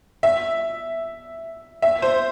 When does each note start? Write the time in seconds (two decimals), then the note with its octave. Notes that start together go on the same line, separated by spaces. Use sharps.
0.23 E5
1.82 E5
2.02 C5